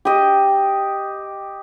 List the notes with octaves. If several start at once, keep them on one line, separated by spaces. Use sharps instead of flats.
G4 D#5